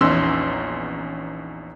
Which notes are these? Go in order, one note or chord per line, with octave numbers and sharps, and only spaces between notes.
A#1 E2 C#4 D#4 C6 E6